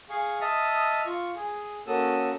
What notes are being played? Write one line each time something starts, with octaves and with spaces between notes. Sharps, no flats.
G#4 F5 C#6
D#5 E5 A5 D#6 F6
F4 C#6
G#4
A#3 C#4 F#4 A4 D#6 E6